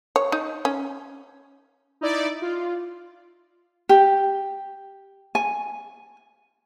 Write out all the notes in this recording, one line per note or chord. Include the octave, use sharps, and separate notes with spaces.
C#5
D#4
C#4
D#4 E4 D5
F4
G4
G#5